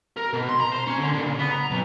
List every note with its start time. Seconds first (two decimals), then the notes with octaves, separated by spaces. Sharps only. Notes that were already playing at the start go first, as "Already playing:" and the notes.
0.17 A#4
0.33 B2
0.49 C6
0.60 A#5
0.72 C5
0.87 C#4
0.99 D3
1.13 A#2
1.24 C#3
1.39 B3
1.51 A#5
1.71 B1